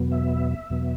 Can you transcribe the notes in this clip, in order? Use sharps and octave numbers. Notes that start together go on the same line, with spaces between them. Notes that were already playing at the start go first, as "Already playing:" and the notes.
Already playing: E2 B2 F#3 B3
E5
E2 B2 F#3 B3